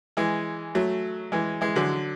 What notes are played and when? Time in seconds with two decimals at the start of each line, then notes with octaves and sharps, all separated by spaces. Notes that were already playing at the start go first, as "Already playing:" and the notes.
0.17 E3 G#3
0.75 F#3 A3
1.32 E3 G#3
1.61 E3 G#3
1.76 D3 F#3